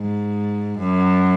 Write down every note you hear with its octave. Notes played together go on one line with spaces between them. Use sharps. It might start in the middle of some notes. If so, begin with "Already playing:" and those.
Already playing: G#2
F#2